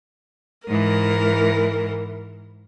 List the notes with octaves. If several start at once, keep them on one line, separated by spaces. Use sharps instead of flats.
G#2 E3 A#4